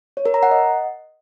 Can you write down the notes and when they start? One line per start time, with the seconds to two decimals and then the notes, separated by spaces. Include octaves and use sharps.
0.17 C#5
0.26 A#4
0.34 A#5
0.43 F#5
0.51 D#5